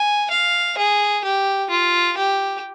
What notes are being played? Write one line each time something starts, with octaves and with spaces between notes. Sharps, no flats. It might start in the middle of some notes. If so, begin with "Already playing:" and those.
Already playing: G#5
F5
G#4
G4
F4
G4